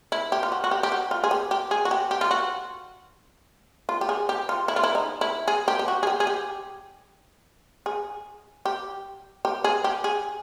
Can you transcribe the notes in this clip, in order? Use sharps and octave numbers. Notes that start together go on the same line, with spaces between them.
E4
G4
F4
F#4
F#4
G4
G4
F#4
F4
G#4
G4
G4
G#4
F#4
G4
G4
F4
F#4
F4
G4
G#4
G4
F4
E4
F4
E4
D#4
E4
G#4
G4
G4
F#4
G#4
G4
G#4
G4
G#4
G4
G4
G#4
G4
G#4